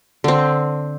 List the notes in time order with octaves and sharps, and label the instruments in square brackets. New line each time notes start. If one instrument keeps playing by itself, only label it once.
[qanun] D3 C4